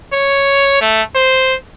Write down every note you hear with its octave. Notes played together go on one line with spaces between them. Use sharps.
C#5
A3
C5